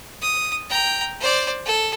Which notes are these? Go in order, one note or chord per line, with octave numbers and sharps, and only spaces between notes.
D#6
G5 A#5
C5 D5
A4